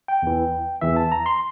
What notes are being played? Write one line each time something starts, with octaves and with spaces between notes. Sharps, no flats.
G5
E2 E3
E2 E3 E5
A5
A#5
C6